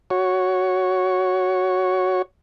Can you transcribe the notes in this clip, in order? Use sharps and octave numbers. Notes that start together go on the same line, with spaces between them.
F#4 C#5